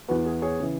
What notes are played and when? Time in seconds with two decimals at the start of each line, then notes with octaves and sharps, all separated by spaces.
0.08 E2 E3 B3 F#4 B4
0.26 G#4
0.42 G#4 C#5
0.60 C#3 E3